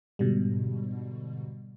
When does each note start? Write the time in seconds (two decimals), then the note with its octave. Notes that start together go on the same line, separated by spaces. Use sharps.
0.19 G#2 B2 D3 G3